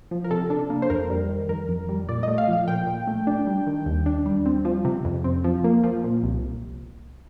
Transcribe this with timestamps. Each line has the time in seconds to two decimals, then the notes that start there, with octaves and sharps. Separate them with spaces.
0.11 F3
0.24 A#4
0.31 C3 A4
0.50 D4
0.70 A#3
0.82 C5
0.90 F2 A#4
1.10 G3
1.29 D#3
1.49 F2 A#4
1.69 F2
1.89 G3
2.08 A#2 D5
2.23 A3 D#5
2.38 F5
2.48 F3
2.53 F5
2.68 A#2 G5
2.87 A#2
3.07 A3
3.27 D4
3.47 G3
3.66 D#3
3.86 D#2
4.06 D4
4.26 G3
4.46 C4
4.65 F3
4.85 C3
5.05 F2
5.24 C4
5.44 F3
5.64 A#3
5.83 F3
6.04 A#2
6.23 C2